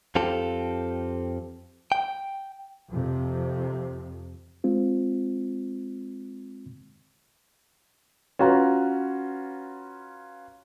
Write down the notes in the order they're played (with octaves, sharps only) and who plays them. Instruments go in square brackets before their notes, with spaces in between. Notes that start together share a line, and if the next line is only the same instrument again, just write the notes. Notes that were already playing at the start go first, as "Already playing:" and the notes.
[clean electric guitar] F2 C4 F4 G4 A4
G5
[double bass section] F2 C3
[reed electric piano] G#3 C4 F4
[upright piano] C#4 F4 F#4 B4 A#5